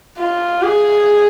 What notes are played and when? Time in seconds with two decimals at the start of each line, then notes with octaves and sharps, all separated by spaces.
0.18 F4
0.62 G#4